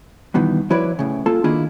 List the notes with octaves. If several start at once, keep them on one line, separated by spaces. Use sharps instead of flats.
G2 B2 D#3 E3
F3 E4 F#4 B4 C#5 D5
A2 C#3
A#3 F4 A4 A5
D#3 A#3 D4 E4 F4 G#4